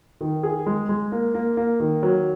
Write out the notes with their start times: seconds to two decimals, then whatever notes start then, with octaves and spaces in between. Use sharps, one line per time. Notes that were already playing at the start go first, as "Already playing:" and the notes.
0.21 D#3
0.43 G#4
0.66 G#3
0.89 G#3
1.12 A#3
1.34 A#3
1.57 A#3
1.80 D#3
2.03 F#3